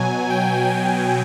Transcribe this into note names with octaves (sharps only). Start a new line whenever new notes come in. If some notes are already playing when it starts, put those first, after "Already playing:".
Already playing: B2 F#3 G#5
G5
G5